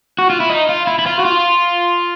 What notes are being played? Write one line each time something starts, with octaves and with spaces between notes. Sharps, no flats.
F#4
F4
E4
D#4
F4
E4
E4
F4
F#4
F4